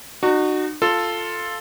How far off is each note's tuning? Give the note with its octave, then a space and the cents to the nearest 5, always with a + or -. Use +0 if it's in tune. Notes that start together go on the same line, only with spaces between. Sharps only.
D#4 -40 F#4 +0
F4 +0 A4 +0